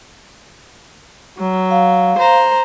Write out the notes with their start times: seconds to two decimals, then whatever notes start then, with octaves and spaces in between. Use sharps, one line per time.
1.38 F#3
1.71 F5
2.18 C5 A#5